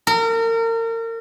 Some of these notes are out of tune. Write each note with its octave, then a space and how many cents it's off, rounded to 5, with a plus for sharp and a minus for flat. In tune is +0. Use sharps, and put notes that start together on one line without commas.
A#4 -35